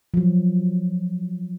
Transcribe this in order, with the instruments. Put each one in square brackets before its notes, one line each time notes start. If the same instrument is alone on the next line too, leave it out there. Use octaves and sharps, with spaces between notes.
[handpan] F3 F#3